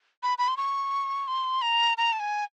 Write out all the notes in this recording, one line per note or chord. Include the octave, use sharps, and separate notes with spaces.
B5
B5
C6
C#6
C6
A#5
A#5
A5
G#5